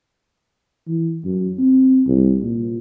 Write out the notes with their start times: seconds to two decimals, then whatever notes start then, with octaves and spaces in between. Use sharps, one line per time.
0.87 E3
1.25 F#2
1.59 C4
2.07 C2
2.43 A#2